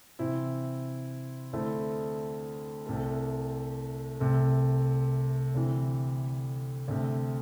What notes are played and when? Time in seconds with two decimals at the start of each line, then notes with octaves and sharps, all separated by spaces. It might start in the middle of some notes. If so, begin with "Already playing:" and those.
0.19 C3 E3 C4 E4
1.53 D2 D3 A3 C4 E4
2.87 C2 C3 A3
4.20 C2 C3 A3
5.55 D2 C3 E3
6.88 D2 C3 A3